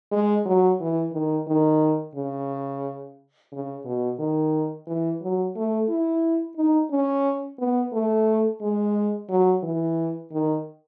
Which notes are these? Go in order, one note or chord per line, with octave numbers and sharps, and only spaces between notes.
G#3
F#3
E3
D#3
D#3
C#3
C#3
B2
D#3
E3
F#3
A3
E4
D#4
C#4
B3
A3
G#3
F#3
E3
D#3